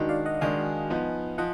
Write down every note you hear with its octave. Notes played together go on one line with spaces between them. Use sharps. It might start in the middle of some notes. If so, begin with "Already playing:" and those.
Already playing: D#3 G#3 D4 D#4 F#4
D5 F5
D#5 F#5
D#3 G#3 D4 F5 G#5
F3 B3 D#4
F3 D#5 F#5